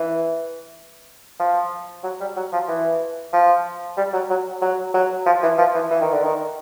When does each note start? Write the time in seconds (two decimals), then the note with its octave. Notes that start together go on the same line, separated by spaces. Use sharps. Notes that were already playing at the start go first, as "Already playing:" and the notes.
Already playing: E3
1.39 F3
2.04 F#3
2.20 G3
2.36 F#3
2.53 F3
2.68 E3
3.33 F3
3.97 G3
4.13 F#3
4.30 F#3
4.62 F#3
4.94 F#3
5.26 F3
5.43 E3
5.58 F3
5.75 E3
5.91 E3
6.01 D#3
6.13 D3
6.23 D#3